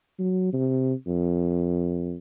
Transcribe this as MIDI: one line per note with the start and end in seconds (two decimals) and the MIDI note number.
0.19 0.49 54
0.53 0.93 48
1.07 2.17 41